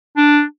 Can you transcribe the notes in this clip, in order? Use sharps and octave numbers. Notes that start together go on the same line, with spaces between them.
D4